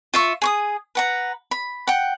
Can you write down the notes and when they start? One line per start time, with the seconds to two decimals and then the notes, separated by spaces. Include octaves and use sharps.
0.14 F4 E5 C#6
0.42 G#4 C#6 D#6
0.95 B4 F#5 A#5
1.51 B5
1.87 F#5 G5